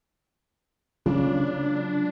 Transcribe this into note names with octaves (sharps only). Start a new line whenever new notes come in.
C#3 F#3 G#3 A#3 D4 F4